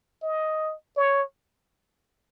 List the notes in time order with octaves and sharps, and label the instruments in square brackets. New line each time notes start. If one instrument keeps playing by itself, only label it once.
[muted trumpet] D#5
C#5